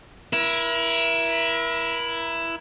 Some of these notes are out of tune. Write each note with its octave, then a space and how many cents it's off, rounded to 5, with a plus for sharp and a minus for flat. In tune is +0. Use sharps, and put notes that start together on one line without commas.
E4 +10 A#4 +40